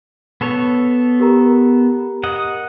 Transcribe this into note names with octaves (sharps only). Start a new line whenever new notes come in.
B3 A4 C#5
G4 A#4 A#5
D#5 F#5